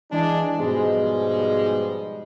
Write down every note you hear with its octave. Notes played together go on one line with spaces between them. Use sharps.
E3 G#3 D4
G#2 B2 F3 G3 G#3